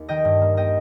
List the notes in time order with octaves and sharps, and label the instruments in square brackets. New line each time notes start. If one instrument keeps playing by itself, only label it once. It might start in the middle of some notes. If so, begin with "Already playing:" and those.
Already playing: [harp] D#2
D#3 D#5 G5
G2
A#3
A#3 D#5 G5